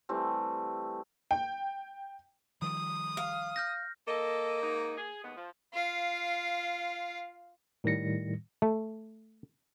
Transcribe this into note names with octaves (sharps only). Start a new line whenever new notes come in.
E3 G3 A3 C4
G5
D#3 F3 G3 D#6
F5
F6 G6 A#6
A#3 A4 D#5
G#2 D#4
G#4
D#2 G#3 B3
F3
F4 F5
A2 D#3 G3 A#6 C#7
A3